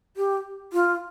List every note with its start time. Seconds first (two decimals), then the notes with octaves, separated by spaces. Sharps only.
0.17 G4
0.73 F4